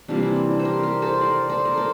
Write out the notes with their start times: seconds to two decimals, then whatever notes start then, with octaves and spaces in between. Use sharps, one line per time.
0.08 C3 E3 G3 A#3 D4 F4
0.22 C4 E4
0.51 D4
0.59 C5
0.65 G4 A#4
0.83 G4 A#4
1.02 A4 C5
1.21 A#4 D5
1.49 A4 C5
1.65 A#4
1.77 A4 C5